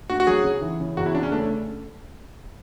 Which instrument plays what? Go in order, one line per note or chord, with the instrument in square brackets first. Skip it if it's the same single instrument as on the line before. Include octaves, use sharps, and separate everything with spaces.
[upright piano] D2 [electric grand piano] F#4
[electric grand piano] F#4
[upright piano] F#3 [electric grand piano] G#4
[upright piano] C#3
E3
C#3
[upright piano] E2 [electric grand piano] F#4
[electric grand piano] E4
[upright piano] C#3 [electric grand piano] D4
[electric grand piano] C#4
[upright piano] A3 [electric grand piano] D4